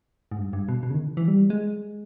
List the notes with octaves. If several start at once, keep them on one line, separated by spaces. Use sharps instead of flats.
G#2
G2
G2
B2
B2
C#3
D#3
E3
G3
G#3